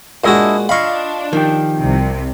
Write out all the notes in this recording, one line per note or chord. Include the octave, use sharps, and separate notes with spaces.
A#2 G#3 D4 E4 F#4 D#5
D4 F4 D#5 F5 B5 C#6
D#3 F3 G4
C2 C3